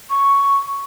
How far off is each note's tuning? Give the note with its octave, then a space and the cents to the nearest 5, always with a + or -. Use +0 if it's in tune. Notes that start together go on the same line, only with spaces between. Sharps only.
C#6 +5